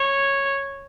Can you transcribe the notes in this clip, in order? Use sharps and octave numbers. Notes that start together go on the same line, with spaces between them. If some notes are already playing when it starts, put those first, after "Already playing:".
Already playing: C#5